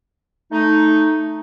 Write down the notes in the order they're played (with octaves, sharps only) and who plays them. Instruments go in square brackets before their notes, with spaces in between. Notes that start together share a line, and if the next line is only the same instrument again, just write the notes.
[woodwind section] A3 D#4